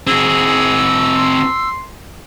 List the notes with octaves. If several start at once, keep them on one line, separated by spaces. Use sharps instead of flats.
C4 F#4 G#4 E6
C6